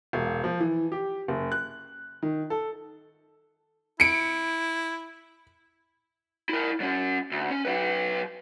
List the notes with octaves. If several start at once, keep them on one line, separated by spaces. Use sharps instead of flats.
E1
F3
E3
G4
F#1
F#6
D#3
A4
E4 C#7 D7
E4 A#4
F#3 C#4
D2
C#4
F#3 B4